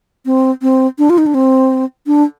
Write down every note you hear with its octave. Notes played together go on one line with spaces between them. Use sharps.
C4
C4
D4
F4
D#4
D4
C4
D4